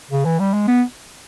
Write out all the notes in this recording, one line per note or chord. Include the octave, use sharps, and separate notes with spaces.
C#3
E3
G3
G#3
B3